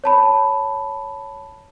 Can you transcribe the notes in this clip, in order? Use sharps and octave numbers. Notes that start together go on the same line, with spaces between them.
C#5 A5 B5